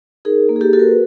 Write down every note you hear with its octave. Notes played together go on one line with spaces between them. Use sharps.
D#4 G#4 A#4
A#3
G#4
G4 A4
F#4 A4
G#4 A#4
B4